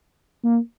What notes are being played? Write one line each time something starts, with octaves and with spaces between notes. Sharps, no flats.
A#3